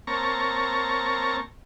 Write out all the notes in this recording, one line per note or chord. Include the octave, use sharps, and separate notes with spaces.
A#3 C4 C#5 A5 A#5 C#6